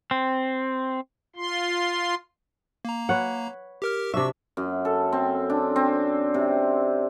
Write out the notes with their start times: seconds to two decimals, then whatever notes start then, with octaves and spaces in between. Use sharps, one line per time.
0.11 C4
1.36 F4 C6
2.85 A#3 A#5
3.09 B4 C#5 F#5
3.82 G4 A#4 F6
4.14 C3 D4 E5 C#6 E6
4.57 F#2
4.85 A4
5.13 C4
5.50 D4
5.76 C4
6.34 C3